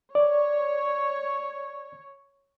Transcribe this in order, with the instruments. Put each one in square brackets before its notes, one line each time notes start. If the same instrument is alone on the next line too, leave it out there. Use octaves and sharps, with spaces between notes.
[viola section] C#5 [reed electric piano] D5